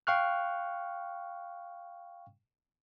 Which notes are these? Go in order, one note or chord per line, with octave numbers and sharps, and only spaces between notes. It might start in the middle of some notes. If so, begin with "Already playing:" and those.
F5 G5 C#6 F6 F#6